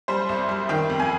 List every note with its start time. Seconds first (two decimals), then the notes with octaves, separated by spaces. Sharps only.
0.08 G3 C5
0.29 C2
0.49 G3
0.69 D#3 G5
0.90 F2
1.00 G#5